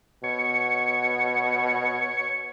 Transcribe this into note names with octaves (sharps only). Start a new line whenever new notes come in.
B2 C#5